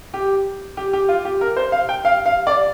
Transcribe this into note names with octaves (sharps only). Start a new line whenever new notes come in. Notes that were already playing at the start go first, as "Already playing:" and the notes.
G4
G4
G4
F4
G4
A#4
C5
F5
G5
F5
F5
D5